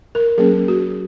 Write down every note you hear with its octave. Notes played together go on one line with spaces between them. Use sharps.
A#4
F#3 A#3 C#4 G#4
F#4